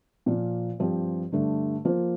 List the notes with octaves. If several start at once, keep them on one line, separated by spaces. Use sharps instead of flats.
A#2 F3 A#3 F4
G2 F3 C4 G4 C5
G2 D3 A3 D4
F3 A#3 F4 C5